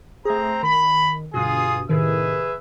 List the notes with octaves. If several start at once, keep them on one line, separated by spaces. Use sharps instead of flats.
A3 C4 G#4 C5 A#5
D#3 B5
G1 G2 B2 F4 G#4 D#6
A2 C3 D#3 G#4 B4 E5